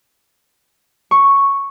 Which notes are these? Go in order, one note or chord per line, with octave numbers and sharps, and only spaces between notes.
C#6